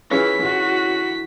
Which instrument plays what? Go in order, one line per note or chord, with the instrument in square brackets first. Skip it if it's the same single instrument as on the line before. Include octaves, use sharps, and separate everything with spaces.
[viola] E3 [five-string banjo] C#4 F4 G#4 [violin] B6
[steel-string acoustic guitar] D3 E3 [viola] F#4